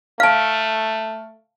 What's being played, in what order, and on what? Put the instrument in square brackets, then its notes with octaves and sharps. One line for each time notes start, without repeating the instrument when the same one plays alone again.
[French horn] A3 [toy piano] F5 A5 [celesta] F6 D7